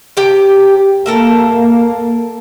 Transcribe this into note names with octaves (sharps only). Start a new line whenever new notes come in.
C3 G4 G5
A#3 A4 A#4 E5